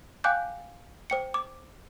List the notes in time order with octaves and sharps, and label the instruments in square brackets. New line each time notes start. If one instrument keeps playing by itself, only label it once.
[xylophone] F5 G5 G#5 D6 F#6 G6
C5 G5 C#7
D6